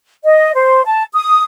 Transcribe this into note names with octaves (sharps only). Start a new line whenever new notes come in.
D#5
C5
A5
D#6